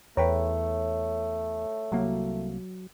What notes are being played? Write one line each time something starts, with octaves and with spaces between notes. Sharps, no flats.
E2 A3 B4 C#5 G5 A#5
C2 F#3 A#3